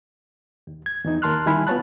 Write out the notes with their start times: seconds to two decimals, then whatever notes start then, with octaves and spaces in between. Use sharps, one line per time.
0.67 D#2
0.86 G#6
1.04 E2 E3 D#4
1.22 D#2 A#4 A5 C6 F6 F#6
1.46 D#3 G3 E4 G#5 B5 F6
1.67 B3 F4 C#5 A5 F#6